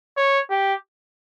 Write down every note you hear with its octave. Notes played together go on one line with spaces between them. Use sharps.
C#5
G4